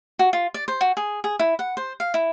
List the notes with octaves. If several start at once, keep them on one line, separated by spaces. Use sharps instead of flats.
F#4
F4
D5
C5
F#4
G#4
G#4
E4
F#5
C5
F5
E4